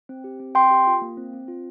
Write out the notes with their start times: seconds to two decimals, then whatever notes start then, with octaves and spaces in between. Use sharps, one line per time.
0.09 C4
0.24 G4
0.40 C4
0.55 C4 G5 C6
0.71 G4
0.87 F4
1.02 A#3
1.17 C4
1.33 C4
1.48 F4